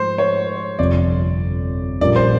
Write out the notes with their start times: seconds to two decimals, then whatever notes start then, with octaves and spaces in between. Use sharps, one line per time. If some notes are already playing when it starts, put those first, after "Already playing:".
Already playing: G#2 F3 A3 C5
0.18 C#5
0.79 G1 F2 C3 D5
2.01 A#1 A#2 G3 A#3 C#4 D5
2.16 C5